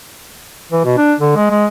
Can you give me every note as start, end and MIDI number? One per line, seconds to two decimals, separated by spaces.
0.72 0.83 52
0.85 0.96 47
0.98 1.14 62
1.20 1.33 50
1.36 1.50 56
1.51 1.66 56